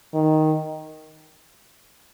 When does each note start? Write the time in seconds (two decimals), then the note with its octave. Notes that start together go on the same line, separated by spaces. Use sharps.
0.14 D#3